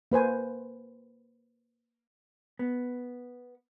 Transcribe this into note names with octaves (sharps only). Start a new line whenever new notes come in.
A#3 B4 C5 G#5
B3